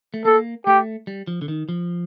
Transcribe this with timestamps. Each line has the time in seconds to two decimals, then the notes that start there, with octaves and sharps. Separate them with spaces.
0.14 A3
0.25 A#3 A4
0.67 A3 G4
1.07 G3
1.27 F3
1.42 D3
1.48 D#3
1.69 F3